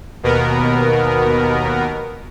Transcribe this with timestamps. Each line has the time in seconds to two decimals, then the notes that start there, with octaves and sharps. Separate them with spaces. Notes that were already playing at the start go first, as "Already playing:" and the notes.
0.23 D#2 B2 B3 A#4